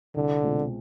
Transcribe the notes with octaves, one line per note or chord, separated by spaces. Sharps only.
C2 D3
B2 G#3 C4 F4